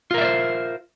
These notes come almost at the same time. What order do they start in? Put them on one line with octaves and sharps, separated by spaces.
F4 A#4 E5 D5 C5